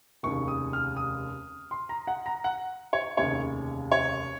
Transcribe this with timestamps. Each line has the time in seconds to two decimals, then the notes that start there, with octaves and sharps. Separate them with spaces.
0.23 F1 D#2 C#3 C#6
0.48 D#6
0.73 F6
0.97 D#6
1.71 C6
1.89 A#5
2.07 F#5
2.26 A#5
2.44 F#5
2.93 C#5
3.17 F1 D#2 C#3 C#5
3.92 C#5